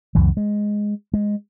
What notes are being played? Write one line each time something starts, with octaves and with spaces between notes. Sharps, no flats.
C#2 F#2 E3
G#3
G#3